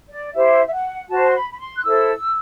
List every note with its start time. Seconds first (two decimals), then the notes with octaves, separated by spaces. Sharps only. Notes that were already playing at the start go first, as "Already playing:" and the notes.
0.08 D5
0.33 E4 G4 C5 E5
0.65 E5
0.71 F#5
1.08 F#4 C5 A5
1.29 C6
1.33 B5
1.51 B5
1.59 C6
1.75 F#6
1.83 E4 A4 C5 E6